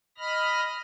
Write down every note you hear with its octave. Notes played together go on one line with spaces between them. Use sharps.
D#5 B5 F6 A#6